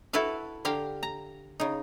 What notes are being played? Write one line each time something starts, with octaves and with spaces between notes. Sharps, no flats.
E4 F#4 A4 B4 F5
D3 G4 F5 G5 A#5
A#5
C#3 D#4